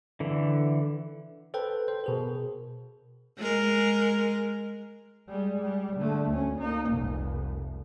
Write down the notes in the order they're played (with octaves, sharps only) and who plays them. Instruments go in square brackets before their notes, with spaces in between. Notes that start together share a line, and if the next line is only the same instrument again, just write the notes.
[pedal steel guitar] D3 E3
[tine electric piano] A4 B4 C5 G5
C5
B2 G#4 A#4
[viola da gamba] G#3 A#4
[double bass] G3 G#3
G3
D3 A3
D2 C#4
A#3 D#4
F1 C2